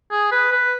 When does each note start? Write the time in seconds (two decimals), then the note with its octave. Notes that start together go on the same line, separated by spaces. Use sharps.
0.11 G#4
0.32 B4
0.52 B4